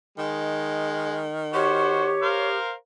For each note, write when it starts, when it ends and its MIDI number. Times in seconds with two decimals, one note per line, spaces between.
0.18 2.28 51
0.18 1.24 56
1.54 2.10 66
1.54 2.58 67
1.54 2.10 72
1.54 2.48 73
2.22 2.73 70
2.22 2.73 72
2.22 2.73 77